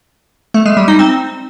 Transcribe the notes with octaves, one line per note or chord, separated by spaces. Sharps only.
A3
G#3
G3
D#4
C4